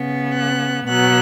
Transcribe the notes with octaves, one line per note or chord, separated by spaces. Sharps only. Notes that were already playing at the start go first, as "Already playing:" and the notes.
Already playing: C#3 B3
F#6
B2 F#3 B3 F#6